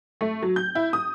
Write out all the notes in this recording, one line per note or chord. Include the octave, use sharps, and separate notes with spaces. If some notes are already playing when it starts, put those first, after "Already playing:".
A3
F#3
G6
E4
D#6